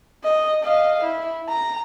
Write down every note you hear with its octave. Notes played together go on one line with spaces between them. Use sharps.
D#5
D#5 F5
E4
A#5